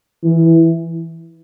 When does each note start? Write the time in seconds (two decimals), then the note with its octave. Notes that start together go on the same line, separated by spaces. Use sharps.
0.24 E3